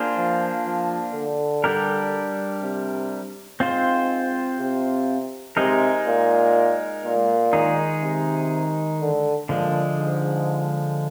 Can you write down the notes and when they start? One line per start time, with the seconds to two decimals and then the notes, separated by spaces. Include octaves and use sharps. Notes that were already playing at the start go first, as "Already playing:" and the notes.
Already playing: A#3 D4 F4 G#4 C5
0.16 F3
0.65 F3
1.14 D3
1.64 G3 D4 G4 A#4
2.62 C3
3.60 G#2 C4 F4 C5
4.58 C3
5.57 C3 G#3 D#4 A#4
6.06 A#2
7.04 A#2
7.53 D#3 G#3 D#4 G#4
8.02 C3
9.00 D3
9.49 A#2 D3 F3 G#3
9.98 G#2